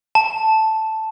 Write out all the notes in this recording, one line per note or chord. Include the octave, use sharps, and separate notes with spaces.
A5